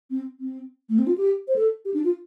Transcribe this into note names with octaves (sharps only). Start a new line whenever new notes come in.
C4
C4
A3
C4
F4
G4
C5
A4
G4
D4
F4